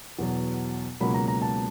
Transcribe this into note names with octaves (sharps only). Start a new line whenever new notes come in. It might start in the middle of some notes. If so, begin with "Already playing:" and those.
E2 B2 F#3
C#2 B2 F#3 A#3 B5
A#5
A#5
A5